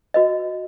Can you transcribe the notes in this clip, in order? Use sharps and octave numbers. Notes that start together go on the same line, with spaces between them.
F#4 B4 D#5